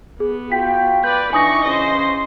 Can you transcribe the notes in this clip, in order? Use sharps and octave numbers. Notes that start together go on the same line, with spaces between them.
B3 G#4
F4 F#4 G5 B6
B4 D5 G6
E3 D4 D#4 G#5 C#6 D#6 A#6
C#3 E3 C#4 C5 D#5